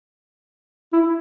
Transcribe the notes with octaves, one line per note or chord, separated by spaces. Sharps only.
E4